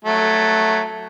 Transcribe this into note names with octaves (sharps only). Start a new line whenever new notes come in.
F#3 A3